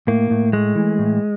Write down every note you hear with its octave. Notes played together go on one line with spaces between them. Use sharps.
A2 A#3
A2
G#3 A3
E3
A2